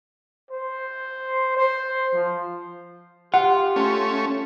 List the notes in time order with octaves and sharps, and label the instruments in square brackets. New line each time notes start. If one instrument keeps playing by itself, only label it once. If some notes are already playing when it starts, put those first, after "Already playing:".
[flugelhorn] C5
C5
F3
[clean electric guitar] F4 [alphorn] G4 [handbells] F#5
[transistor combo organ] A3 C#4